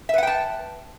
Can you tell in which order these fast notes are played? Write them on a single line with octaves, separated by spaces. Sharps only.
E5 B4 F#5 G5 A5